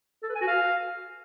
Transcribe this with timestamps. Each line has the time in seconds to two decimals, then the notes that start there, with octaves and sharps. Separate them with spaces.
0.23 A4
0.29 B4
0.35 G#5
0.41 F#4
0.47 F5